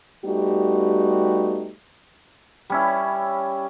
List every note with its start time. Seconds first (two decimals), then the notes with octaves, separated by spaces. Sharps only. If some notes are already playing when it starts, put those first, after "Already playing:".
0.24 G3 A3 B3 D#4 F#4 G4
2.70 G3 C#4 E4